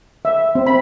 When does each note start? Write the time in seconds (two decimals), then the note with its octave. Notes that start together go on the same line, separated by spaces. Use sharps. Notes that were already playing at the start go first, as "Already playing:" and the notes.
0.25 E5
0.55 C4
0.67 B5